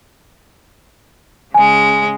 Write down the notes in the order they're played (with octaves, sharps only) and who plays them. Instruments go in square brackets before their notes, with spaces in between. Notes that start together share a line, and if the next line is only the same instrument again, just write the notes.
[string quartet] C#3 G#3 [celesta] G#5